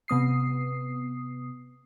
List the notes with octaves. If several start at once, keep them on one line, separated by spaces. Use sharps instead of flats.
C3 B3 D#6 C7